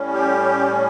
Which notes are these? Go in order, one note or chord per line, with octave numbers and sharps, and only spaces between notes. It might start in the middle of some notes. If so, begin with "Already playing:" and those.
Already playing: A2 G3 C#4
G4